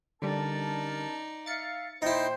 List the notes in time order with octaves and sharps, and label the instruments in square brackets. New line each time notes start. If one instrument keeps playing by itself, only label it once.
[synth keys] D3 G3 [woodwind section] C#4 A#4 A5 [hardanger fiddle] D#4 D5
[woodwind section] E5 F5 [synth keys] A6 C#7
[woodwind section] A#2 A#3 C5 [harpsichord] D#4 E4 [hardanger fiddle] G5